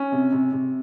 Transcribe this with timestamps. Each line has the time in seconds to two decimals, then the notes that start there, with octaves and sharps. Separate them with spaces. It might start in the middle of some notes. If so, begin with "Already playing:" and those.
Already playing: C#4
0.12 C3
0.32 C3
0.52 C3